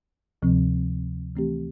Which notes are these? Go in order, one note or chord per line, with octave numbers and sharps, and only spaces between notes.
D2 C3 F3 C4
E3 A3 C4 G4